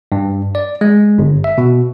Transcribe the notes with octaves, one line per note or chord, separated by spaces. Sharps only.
G2
D5
G#3
G1
E5
B2